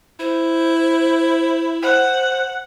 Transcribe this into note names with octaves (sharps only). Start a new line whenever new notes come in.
E4 C5
C5 F#5